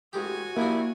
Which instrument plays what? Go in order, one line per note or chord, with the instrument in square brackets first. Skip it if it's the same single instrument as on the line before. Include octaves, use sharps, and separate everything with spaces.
[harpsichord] A1 G#3 G4 [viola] F#4 G#5
[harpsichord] D#2 F3 D4 [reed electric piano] A#3 [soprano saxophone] E4